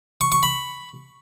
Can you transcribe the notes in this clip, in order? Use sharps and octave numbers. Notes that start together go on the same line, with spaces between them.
C#6
C#6
B5